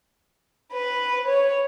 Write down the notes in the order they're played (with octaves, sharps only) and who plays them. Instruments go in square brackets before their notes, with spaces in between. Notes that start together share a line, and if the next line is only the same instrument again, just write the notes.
[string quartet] B4
C#5